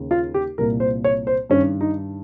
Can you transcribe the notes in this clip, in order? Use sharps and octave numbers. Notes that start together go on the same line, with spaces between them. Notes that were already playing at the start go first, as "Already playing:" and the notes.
Already playing: D#2 C#3
F4
G4
C2 A#2 A#4
C5
C#5
C5
G2 D#3 C#4
D#4